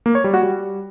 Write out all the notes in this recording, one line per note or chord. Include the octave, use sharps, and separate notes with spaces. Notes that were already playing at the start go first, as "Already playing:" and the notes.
A#3
C#5
G3
F#4
G3